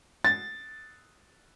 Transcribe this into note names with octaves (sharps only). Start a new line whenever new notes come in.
A6